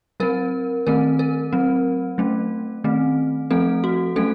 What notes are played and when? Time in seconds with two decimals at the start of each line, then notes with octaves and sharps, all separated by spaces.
0.20 F#3 C4 A#4
0.87 D#3 A3 C4 A#4
1.19 A#4
1.53 F#3 C4
2.18 F#3 A3 C#4
2.84 D#3 A3 C4
3.51 F3 A3 C4 A4
3.84 F#4
4.16 F#3 A3 C#4 A4